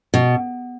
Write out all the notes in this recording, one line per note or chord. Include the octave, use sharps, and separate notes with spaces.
B2